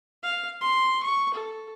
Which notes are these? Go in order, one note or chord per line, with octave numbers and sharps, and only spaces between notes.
F5
C6
C#6
A4